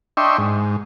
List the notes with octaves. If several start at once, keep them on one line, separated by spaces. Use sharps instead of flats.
D4 D#5 E5 G5 C6 C#6
G#2